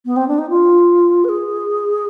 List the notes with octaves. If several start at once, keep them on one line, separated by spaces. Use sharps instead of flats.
B3
C4
D4
D#4
F4
B4
G#4